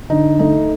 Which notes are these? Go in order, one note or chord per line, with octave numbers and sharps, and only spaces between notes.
D3 D#4
A3 D#4